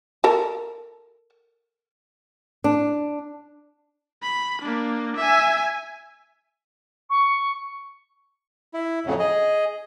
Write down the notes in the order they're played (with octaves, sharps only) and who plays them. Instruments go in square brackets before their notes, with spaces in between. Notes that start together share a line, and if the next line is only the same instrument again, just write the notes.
[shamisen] A4 A#4 A5
[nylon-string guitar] D4
[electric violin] B5
A#3 D4
E5 G#5
[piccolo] C#6
[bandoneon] E4
F2 A2 C#3 F#3
G#4 D#5